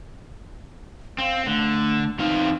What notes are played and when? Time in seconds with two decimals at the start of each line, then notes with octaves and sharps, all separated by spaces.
1.18 C4 F5
1.47 D3 A3
2.19 E2 C4 D#4 F5